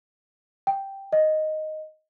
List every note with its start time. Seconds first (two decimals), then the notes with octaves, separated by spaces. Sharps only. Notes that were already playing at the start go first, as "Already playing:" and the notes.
0.67 G5
1.13 D#5